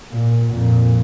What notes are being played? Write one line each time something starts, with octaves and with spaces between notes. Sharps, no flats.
A#2
F2 A#2